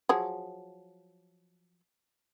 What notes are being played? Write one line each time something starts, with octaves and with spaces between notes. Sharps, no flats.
F3 F#3 G#4